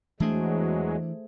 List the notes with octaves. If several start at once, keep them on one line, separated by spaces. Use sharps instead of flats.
E2 E3 F#3 G#3 A3 D4 G#4 C5